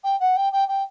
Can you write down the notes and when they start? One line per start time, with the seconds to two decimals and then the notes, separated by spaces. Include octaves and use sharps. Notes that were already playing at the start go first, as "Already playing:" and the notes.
0.04 G5
0.20 F#5
0.36 G5
0.53 G5
0.68 G5